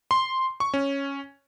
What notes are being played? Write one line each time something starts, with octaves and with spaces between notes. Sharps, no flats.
C6
C#6
C#4